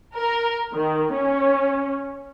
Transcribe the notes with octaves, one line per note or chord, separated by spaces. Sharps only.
A#4
D#3
C#4